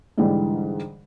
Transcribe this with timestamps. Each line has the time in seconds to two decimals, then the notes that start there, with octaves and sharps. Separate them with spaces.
0.18 G#2 D3 E3 G3 G#3